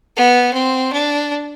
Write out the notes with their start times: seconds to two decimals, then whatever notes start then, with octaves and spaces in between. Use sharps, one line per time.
0.17 B3
0.54 C4
0.93 D4